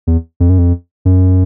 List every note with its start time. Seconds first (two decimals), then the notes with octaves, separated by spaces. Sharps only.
0.07 E2
0.40 F2
0.49 F#2
0.58 F2
1.05 F#2